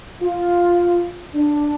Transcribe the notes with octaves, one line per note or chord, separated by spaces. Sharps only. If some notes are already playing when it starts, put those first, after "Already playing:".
F4
D4